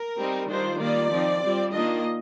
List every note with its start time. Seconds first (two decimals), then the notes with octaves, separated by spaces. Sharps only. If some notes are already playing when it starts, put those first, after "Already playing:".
Already playing: A#4
0.18 G3 C4 D#4
0.48 D#3 G3 D4 F4 C5
0.80 D#3 G3 A#3 F4 D5
1.11 F3 C4 D#4
1.42 G3 C4 F4
1.73 D#3 A#3 D4 F4 D#5